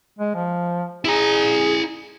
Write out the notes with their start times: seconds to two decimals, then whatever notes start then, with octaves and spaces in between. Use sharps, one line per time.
0.19 G#3
0.35 F3
1.05 E4 G#4 A#5